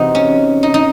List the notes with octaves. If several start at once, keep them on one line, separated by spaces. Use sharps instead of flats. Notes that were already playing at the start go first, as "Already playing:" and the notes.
Already playing: C3 E3 C4 D#4 F#4
C#4
D#4
D#4